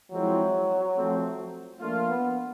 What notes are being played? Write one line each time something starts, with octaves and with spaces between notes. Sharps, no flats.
F3 F#3 G#3 C4 E4
F3 A3 C4
F3 A3 A#3 D4 F4
B3